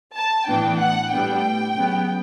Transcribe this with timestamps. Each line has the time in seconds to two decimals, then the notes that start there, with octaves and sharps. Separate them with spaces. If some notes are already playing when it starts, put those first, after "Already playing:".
0.16 A5
0.48 A2 E3 B3 D4 G5
0.80 F#5
1.12 A2 G3 B3 D4 G5
1.76 C#3 F#3 B3